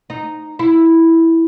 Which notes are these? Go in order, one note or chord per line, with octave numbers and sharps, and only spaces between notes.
D#4
E4